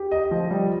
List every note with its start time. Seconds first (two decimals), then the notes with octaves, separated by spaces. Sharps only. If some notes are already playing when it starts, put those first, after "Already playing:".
Already playing: G4
0.11 D#5
0.31 F3
0.51 G3